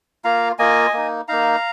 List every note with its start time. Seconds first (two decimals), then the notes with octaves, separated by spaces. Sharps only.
0.24 A#3 F4 F5 A#5
0.59 A#3 F4 D#5 G#5
0.93 A#3 D#4
1.28 A#3 D#4 F5 A#5